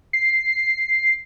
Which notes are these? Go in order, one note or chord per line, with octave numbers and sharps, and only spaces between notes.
C7